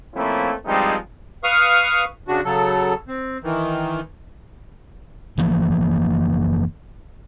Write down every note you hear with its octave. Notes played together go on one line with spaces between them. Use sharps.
F3 A3 A#3 C4 C#4 E4
G2 F3 G3 G#3 C4 D#4
B4 F5 C#6 D#6 F6
C#3 D4 F#4
C#3 F#3 A4
C4
D#3 E3
F#1 E3 F3 A#3